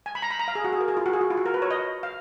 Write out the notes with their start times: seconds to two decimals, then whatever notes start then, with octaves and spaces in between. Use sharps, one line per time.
0.06 G#5
0.15 B5
0.22 A#5
0.31 B5
0.40 A#5
0.48 F5
0.55 G#4
0.64 F#4
0.72 G#4
0.80 A#4
0.88 G#4
0.97 F4
1.06 F#4
1.13 G#4
1.21 F#4
1.30 F4
1.37 F#4
1.46 A#4
1.54 B4
1.62 C#5
1.71 D#5
2.03 F5